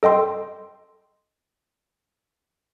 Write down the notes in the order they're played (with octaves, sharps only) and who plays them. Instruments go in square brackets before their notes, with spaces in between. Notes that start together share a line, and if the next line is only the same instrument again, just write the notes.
[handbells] A4 D#5 G5 C6